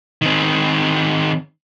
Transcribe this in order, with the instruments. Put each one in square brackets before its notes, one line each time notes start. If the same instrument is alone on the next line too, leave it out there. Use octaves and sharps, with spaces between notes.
[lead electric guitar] D#3 C4